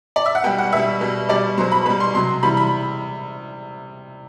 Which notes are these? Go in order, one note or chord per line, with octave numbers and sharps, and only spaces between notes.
D5
E5
F#5
B2 G3 G5
F#5
B2 G3 E5
B2 G3
B2 G3 D5
B2 F#3 C5
B5
B2 G3 B5
C6
C3 F#3 C6
C3 E3 G3 B5
B5